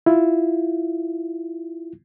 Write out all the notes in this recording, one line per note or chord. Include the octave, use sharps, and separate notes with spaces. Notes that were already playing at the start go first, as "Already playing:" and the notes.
E4 F4